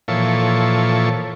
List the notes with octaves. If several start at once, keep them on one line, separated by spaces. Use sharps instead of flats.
A#2 E3 F3 A4 C#5